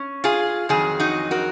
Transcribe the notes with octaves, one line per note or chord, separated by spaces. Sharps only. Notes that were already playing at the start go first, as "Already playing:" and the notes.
Already playing: C#4
F4 G#4
F2 D#3 F#3 G#4
D#4 F#4
F#4 A#4